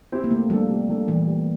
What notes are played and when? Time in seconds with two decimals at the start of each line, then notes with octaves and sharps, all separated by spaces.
0.12 C4 E4 G4
0.24 A#3
0.31 C3 A3
0.50 F3 G3 A#3 D4 A4
0.70 C3
0.88 F3 A#3 D4 A4
1.07 A#2 E3
1.27 G3 A#3